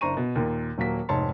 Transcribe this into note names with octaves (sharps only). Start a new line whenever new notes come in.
F#1 D4 C5 A#5 C#6 D#7
B2
D#2 A#2
D#1 F#3 A#3 B6
F1 G#2 C#5 A5 C6